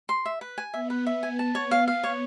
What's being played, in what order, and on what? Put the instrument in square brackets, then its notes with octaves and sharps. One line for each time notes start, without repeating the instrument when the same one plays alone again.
[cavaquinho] C6
E5
B4
G#5
[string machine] B3 [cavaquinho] E5
[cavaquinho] B4
E5
G#5
A5
C#5
F5
F5
C#5